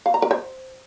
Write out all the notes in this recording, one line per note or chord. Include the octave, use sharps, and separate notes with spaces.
F5
A#5
A#4
C5